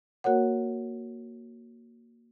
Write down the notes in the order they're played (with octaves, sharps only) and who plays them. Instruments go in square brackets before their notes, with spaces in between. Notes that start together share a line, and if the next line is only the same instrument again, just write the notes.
[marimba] A#3 F#4 A#4 C#5 F#5